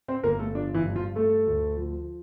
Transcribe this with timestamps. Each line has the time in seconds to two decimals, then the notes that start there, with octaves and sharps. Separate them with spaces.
0.08 C4 C5
0.23 G1 A#3 A#4
0.39 A3 A4
0.55 F3 D4
0.74 E3 E4
0.85 G2
0.96 F3 F4
1.16 A3 A4
1.47 D2
1.77 F3